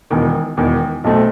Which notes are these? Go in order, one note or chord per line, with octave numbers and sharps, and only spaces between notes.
E1 E2 D#3
E1 E2 D#3
B1 B2 A3 C4